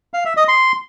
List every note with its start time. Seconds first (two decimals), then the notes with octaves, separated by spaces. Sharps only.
0.14 F5
0.25 E5
0.37 D#5
0.48 C6